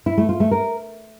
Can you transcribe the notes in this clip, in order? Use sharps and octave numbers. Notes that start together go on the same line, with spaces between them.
E4
A3
F4
A3
A#4